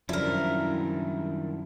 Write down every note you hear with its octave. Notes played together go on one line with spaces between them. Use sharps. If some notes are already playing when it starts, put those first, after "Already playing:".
F#2 D#3 F3 G3 D4 E4 A#4